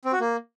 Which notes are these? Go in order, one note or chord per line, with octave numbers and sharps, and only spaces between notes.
C4
F#4
A#3